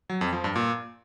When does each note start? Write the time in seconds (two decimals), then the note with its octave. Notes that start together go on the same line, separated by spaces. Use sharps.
0.10 F#3
0.21 F2
0.33 F3
0.44 G2
0.56 A#2